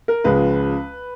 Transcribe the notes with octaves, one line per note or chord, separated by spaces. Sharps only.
A#4
C#2 C#3 F3 G#3 B4